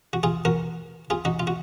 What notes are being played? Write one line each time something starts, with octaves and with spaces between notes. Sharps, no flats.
F#4
F4 G#4
F#4 A#4
F4 G#4
D#4 F#4
F4
F#4